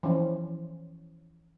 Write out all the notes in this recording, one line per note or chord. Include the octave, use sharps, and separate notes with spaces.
E3 F3 C#4 C5